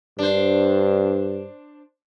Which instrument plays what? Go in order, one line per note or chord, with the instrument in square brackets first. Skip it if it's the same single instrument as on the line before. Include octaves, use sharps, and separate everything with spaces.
[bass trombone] G2 [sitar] D4 C5